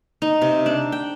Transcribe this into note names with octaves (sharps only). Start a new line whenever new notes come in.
D#4
C3
D4
G5